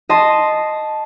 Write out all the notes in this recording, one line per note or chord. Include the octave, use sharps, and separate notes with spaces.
D#5 A5 C6